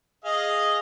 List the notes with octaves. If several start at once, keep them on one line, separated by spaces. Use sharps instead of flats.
G#4 D#5 F5